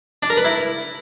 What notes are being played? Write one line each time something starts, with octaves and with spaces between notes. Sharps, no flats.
D4
A#4
B4
E4